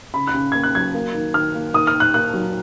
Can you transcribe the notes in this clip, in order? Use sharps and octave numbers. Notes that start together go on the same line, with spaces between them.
C#3 B5
F#6
C#3
A#3 G#6
F#6
F#3 G#6
A#3
D#3
D#3 F6
A#3
D#3 D#6
F6
D#3
F#6
A#3 F#6
F#3